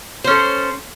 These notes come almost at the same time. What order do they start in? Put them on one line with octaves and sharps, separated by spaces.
C5 C#4 A4